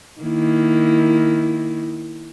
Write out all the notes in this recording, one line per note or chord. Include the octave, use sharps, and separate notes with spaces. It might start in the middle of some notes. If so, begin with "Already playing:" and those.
D#3 A#3 E4